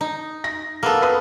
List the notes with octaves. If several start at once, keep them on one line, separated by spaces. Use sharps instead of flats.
D#4
A#6
A#3 B3 A4 F6
B4 D#6